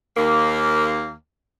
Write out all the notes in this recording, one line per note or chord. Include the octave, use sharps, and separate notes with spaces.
D#2 A#3